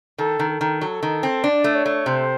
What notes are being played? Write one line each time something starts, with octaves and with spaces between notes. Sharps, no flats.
D#3 A4
D#3
A4
D#3
F#3 A4
D#3
C4
D4 D5
A3
C#5
A3
C3 C5